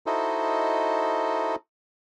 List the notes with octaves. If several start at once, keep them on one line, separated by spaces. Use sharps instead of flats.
D#4 E4 F#4 A4 C5 D#5